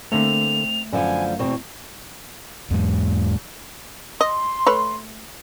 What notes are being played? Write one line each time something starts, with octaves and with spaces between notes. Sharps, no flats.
D3 A3 A#3 C4 A4 F7
F#2 D3 F3 B3 G#5
E2 B2 C4 C#6
E2 G#2 G#3
D#5 C6
A3 B4 C#5